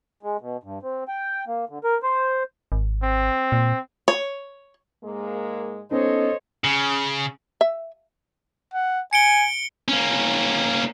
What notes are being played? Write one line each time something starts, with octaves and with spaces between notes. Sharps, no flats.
G#3
B2
G2
C4
G5
A#3
D3
A#4
C5
G#1
C4
A#2
C#5
G#2 G#3 A#3
B3 C#4 D#4 A4 C5 C#5 D#5
C#3
E5
F#5
G#5 C#7 D7 G7
A#3 C#4